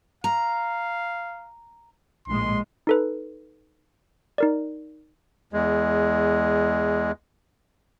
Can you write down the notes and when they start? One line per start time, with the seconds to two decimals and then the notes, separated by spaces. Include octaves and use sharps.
0.24 F5 A#5
2.28 A#1 A2 G#3 C6
2.87 D#4 A4 B4
4.38 D#4 A#4 D5
5.53 E2 G#3